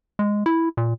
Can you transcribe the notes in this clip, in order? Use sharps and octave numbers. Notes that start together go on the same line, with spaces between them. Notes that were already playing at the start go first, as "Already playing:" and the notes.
G#3
E4
A#2